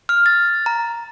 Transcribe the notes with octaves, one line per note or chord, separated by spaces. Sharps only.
F6
A6
A#5